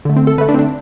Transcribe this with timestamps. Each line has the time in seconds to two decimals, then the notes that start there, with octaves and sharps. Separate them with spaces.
0.05 D3 A3
0.16 C4
0.27 A4
0.38 D3 A3 B4
0.49 D4
0.54 C4
0.59 D4